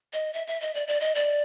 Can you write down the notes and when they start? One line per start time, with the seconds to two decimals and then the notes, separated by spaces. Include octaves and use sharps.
0.13 D#5
0.34 E5
0.47 E5
0.61 D#5
0.75 D5
0.87 D5
1.01 D#5
1.15 D5